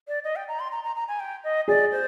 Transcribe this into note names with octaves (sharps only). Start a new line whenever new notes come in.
D5
D#5
G5
A#5
C6
A#5
A#5
A#5
G#5
G5
D#5
G#4 D5
C5